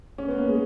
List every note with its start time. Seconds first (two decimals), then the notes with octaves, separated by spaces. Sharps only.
0.18 C#4
0.28 B3
0.38 A#3
0.48 G#3